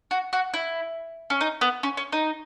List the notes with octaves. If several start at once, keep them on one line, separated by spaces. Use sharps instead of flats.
F#4
F#4
E4
C#4
D#4
B3
C#4
C#4
D#4